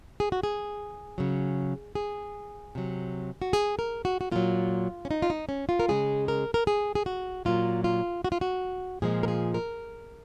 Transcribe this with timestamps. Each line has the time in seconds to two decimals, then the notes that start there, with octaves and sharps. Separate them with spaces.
0.20 G#4
0.32 F#4
0.43 G#4
1.18 C#3 F#3
1.95 G#4
2.75 C3 F#3
3.42 F#4
3.53 G#4
3.79 A#4
4.05 F#4
4.21 F#4
4.32 A#2 F#3 F4
5.05 C#4
5.11 D#4
5.22 F4
5.30 D#4
5.49 C#4
5.69 F4
5.79 A#4
5.88 C#3 G#3 G#4
6.28 A#4
6.54 A#4
6.67 G#4
6.95 G#4
7.06 F#4
7.45 A#2 F#3 F4
7.84 F4
8.25 F#4
8.32 F4
8.41 F#4
9.02 A#2 F3 G#3 G#4
9.23 A#4
9.28 G#4
9.54 A#4